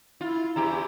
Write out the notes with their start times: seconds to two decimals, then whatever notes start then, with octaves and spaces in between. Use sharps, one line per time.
0.21 E4 F4
0.56 E2 E4 G4 A#5